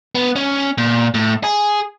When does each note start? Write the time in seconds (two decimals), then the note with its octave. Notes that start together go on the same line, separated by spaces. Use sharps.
0.15 B3
0.36 C#4
0.78 A#2
1.14 A2
1.44 G#4